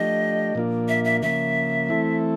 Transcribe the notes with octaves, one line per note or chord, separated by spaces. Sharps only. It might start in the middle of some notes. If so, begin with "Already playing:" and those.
Already playing: F3 A3 D4 G4 D#5
A#2 F3 A#3 D4 F4
E5
E5
C#3 F3 A#3 E5
E3 A3 C4 E4 A4